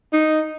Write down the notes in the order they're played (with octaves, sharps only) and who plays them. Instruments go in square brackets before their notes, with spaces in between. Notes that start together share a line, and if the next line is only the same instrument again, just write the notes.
[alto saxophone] D#4